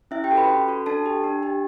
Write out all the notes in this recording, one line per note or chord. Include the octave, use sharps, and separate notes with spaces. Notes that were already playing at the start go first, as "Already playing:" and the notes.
C#4 E4 E5
G4 G5
F#4 A4
B4 B5
C#4
F#4 A4
D4 A4 A5
G4
D4
G4